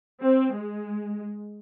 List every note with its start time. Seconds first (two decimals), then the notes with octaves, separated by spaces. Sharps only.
0.23 C4
0.56 G#3